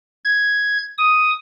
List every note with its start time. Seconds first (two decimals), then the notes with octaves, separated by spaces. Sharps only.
0.25 G#6
0.98 D#6